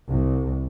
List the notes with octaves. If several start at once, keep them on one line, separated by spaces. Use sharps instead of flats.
C2